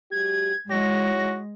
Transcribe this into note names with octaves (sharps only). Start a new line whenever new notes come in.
F#3 G#3 G4 G#6
G#3 D#4 E4 F#4 C#5 A#6